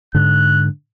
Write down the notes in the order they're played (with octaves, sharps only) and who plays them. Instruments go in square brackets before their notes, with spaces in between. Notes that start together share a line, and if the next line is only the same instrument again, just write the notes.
[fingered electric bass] G#2 D3 [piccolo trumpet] F#6